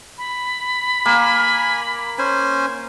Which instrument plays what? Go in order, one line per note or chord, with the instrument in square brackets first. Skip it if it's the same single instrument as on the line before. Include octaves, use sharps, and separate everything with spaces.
[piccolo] B5
[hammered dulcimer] A#3 [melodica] G#5
[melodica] C#4 C5 G#5